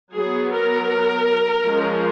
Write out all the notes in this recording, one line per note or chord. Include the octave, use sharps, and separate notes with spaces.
F#3 B3 G#4
A#4
F3 G#3 C#4